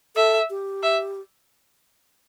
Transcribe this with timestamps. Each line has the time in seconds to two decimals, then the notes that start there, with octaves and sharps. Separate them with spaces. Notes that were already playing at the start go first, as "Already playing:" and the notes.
0.16 A4 E5
0.50 G4
0.83 E5